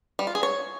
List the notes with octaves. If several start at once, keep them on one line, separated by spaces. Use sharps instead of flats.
G3
F4
G#4
C#5